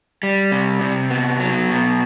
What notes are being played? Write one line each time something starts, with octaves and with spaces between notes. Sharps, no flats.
G3
C3
C3
B3
F#3
B2